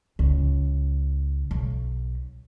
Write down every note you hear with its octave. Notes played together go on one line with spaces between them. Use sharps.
C#2
B1